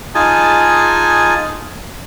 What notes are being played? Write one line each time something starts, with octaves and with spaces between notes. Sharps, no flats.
D#4 F4 G#4 G#5 A5